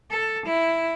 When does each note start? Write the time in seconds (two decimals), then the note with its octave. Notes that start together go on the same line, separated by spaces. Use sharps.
0.10 A4
0.46 E4